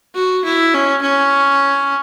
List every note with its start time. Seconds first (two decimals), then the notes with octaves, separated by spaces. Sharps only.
0.15 F#4
0.45 E4
0.74 C#4
1.02 C#4